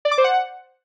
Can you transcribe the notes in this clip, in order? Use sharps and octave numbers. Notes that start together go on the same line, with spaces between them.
D5
D6
C5
F#5